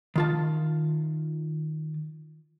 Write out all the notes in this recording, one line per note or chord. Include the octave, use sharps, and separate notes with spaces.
D#3 F4 A5